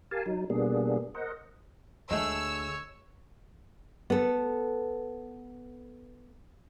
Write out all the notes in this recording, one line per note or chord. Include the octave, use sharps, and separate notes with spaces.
G4 A#4 F5 G#5 A5
F#3 D#4
B2 G3 A#3 B3 D4 G#4
A#4 C5 D#5 F#5
D2 G#3 A3 C#5 E6
B3 A4